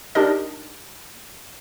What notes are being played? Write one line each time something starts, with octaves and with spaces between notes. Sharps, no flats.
D4 D#4 G4 A#4 D#5